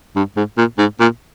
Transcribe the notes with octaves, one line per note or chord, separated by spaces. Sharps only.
G2
G#2
A#2
G#2
A#2